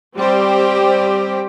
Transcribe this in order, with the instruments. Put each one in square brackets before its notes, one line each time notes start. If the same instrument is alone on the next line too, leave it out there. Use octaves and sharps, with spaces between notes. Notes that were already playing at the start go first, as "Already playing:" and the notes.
[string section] G3 C4 G4 C5